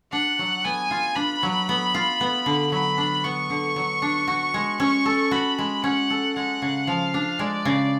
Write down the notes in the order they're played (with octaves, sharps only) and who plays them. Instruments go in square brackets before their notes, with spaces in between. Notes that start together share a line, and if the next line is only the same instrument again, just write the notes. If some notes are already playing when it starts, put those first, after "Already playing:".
[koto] D4 [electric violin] F#5
[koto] F#3
[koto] B3 [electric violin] G#5
[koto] F4
[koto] D4 [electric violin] B5
[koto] F#3
B3
F4
B3
D3
[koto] F#3 [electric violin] B5
[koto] D4
[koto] B3 [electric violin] C#6
[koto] D3
F#3
D4
F#4
G#3
[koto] C#4 [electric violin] C#6
[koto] A4
[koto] F#4 [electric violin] B5
[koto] G#3
[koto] C#4 [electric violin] F#5
[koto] A4
[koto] G#3 [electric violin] F#5
[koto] C#3
[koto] F3 [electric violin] F5
[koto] D4
[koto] G#3 [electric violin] D5
[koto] C#3